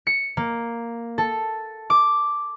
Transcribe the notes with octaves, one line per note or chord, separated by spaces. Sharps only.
C#7
A#3
A4
D6